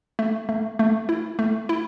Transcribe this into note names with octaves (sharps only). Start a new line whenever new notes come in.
A3
A3
A3
E4
A3
E4